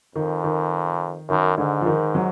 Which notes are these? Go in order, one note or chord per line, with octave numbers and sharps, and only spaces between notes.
F2 D#3
D#3
F#2 D#3
G#2 D3
F3
D#3
F#3